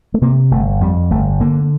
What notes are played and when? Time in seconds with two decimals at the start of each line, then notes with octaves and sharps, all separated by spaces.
0.14 A3
0.22 C3 A#3
0.51 G1 A3
0.81 F2 G3
1.11 G1 A3
1.41 D3 A#3